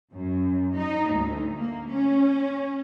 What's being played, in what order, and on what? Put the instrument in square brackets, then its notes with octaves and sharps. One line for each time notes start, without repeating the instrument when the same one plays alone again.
[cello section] F#2
D#4
D2
A#3
C#4